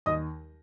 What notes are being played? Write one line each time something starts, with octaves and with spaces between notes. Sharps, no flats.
D#2 D#5 D#6